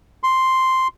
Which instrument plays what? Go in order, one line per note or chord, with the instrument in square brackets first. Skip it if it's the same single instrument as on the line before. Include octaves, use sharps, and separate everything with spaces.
[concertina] C6